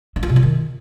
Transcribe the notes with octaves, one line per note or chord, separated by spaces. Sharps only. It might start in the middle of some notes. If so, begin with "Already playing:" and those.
D4
F4
C3
F4
D#3